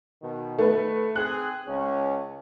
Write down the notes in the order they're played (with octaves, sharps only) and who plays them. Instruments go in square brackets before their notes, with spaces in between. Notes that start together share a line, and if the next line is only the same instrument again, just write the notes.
[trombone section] B2 D#3
[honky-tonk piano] A3 B4
[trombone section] C4 G#4 [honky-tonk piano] F#6
[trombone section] C#2 C#4